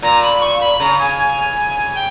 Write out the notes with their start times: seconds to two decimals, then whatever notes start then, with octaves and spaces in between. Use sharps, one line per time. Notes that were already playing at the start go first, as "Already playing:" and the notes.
0.02 A#2 A#5
0.22 B5
0.41 C#6
0.61 B5
0.80 C#3 A#5
0.99 G#5
1.18 G#5
1.95 G5